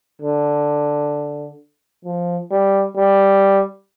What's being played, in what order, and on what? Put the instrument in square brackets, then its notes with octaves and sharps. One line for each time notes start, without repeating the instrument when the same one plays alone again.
[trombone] D3
F3
G3
G3